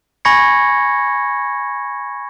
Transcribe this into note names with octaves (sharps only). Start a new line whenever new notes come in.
G#5 B5 C#6 G#6 A#6 C#7